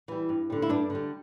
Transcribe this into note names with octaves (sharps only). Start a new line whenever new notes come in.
E3 G3
G2
D3 G3
E4
G2 D4
D3 G3